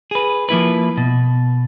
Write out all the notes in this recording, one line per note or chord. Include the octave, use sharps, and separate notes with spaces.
G#4 B4
F3 A#3 E4 B4
B2